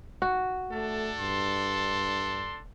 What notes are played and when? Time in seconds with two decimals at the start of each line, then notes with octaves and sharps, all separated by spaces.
0.22 F#4
0.71 A3 D4 A4
1.19 G2 C6